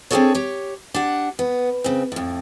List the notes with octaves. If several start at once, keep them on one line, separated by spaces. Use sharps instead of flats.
C4 D4 F4 G#4 A4 C#5
G4 C#5
D4 G4 F#5
B3
C#3 C4
F2 A2